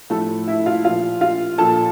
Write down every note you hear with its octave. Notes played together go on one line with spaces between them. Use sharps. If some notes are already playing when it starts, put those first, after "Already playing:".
A2 F3 A3 A4
E4 E5
F4 F5
A#2 F3 F4 F5
F4 F5
A#2 F3 A4 A5